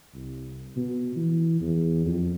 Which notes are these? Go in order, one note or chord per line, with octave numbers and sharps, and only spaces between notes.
C2
B2
E3
E2
F2